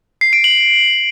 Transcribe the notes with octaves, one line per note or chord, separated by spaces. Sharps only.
C7
D7
F#7